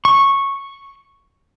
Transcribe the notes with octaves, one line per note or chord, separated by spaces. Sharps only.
C#6